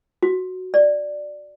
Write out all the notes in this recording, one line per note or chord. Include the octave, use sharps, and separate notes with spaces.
F#4
D5